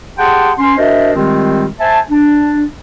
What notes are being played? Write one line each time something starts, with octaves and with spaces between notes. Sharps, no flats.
G4 G#4 F#5 G5 A5 C6
C#4 C6
D4 F#4 A#4 C5 D#5 E5
D#3 G3 G#3 C4 F4 G4
C5 E5 G#5 A5
D4